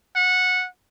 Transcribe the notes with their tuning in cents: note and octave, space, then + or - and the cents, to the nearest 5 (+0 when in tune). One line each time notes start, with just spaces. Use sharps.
F#5 -15